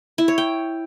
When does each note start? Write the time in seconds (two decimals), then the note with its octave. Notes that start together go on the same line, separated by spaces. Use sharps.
0.18 E4
0.28 C#5
0.38 G5